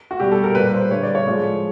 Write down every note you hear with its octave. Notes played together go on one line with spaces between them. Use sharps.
F#4
B2 G3 G4
A4
A#4
A#2 G3 B4
C5
D3 G3 C#5
D5
C#5
A2 F3 G#3